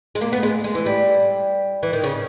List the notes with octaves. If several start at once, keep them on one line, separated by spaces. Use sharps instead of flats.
G#3
A#3
B3
G#3
G#3
E3
G3
E3
D#3
C#3